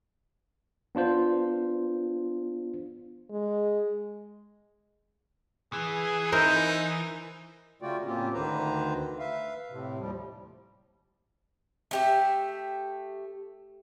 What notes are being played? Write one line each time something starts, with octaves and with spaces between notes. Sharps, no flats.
B3 D4 F4 C5
G#3
E3 G#4
D#4 E4 A#4 C5
C#3 A3 F4 F#4 D5 G5
A2 A#3 C4 C#4 F4 G4
D2 D3 D#3 B4 C5 A#5
B4 E5 F5
A2 C3
D#2 F3 G3
A3 G4 E5